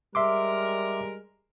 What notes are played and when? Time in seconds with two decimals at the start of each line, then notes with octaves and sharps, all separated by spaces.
0.15 G3 G#3 A#4 E5 C6 D6